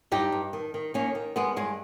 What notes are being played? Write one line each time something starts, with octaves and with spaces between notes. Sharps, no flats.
G2 D#4 G4
G2
D#3
D#3
D#3 A#3 C#4
D#3
D#3 G#3 B3
G2 G#3